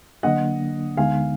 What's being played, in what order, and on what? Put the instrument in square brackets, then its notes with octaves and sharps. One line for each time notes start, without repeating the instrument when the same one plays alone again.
[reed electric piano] D3 F#3 A#3 D4 [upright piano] D#5 F#5
[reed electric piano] D2 D3 G#3 B3 D#4 [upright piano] F5 G#5